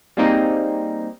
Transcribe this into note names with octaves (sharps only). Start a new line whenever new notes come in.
G3 G#3 A#3 C4 D#4